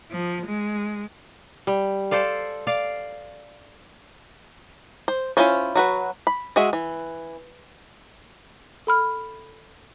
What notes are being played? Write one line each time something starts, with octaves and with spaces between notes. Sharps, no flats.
F3
G#3
G3
A4 C5 D5 F5
D5 F5
C5
C#4 E4 F4 C5 C#5
F#3 F#4 B4
B5
G#3 F#4 G#4 E5
E3
A4 B5 F6